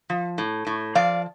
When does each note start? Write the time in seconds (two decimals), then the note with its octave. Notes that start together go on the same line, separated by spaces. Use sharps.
0.10 F3
0.38 A2
0.67 A2
0.95 F3 D5 F5